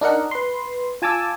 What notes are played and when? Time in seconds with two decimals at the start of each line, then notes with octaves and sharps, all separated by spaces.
0.01 D4 D#4 A#4 F#5
0.31 B4 C6
1.02 F4 G#5 A5 D6 E6